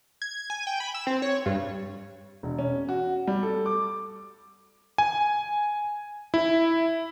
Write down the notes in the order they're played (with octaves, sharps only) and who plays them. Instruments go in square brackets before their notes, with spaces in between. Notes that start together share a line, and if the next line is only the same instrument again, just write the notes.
[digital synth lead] G#6
G#5
G5
B5
E6
C4
C#5
G2
[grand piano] E1
C#4
F#4
G3
A4
D6
[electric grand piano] G#5
E4